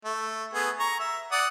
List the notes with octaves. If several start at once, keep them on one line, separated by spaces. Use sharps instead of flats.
A3
A3 B3 G#4
A#5 C#6
E5
D5 F#5 D#6